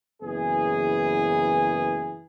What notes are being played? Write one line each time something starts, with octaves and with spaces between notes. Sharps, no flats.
F#1 E3 B3 G#4